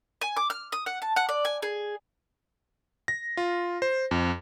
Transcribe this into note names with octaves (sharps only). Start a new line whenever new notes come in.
G#5
D6
F6
D#6
F#5
A5
F#5
D5
G#5
G#4
A#6
F4
C5
F2